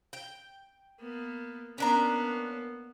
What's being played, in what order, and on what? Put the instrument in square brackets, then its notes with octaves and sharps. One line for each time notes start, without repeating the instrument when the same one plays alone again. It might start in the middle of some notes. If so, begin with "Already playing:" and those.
[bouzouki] G5
[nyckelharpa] A#3 B3
[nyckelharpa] A#3 B3 [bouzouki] C#4 D4 A#5